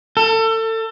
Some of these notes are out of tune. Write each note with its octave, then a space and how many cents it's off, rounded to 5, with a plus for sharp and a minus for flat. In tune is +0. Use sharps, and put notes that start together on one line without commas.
A4 +30